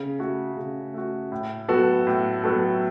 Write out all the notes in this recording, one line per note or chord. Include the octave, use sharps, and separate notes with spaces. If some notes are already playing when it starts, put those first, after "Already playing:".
Already playing: C#3
A3 F#4
C#3
A3 F#4
A2
F#3 B3 F#4 A4
A2
F#3 B3 F#4 A4